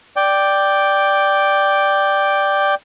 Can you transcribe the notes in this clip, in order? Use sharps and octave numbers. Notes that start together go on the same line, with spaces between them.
D5 G5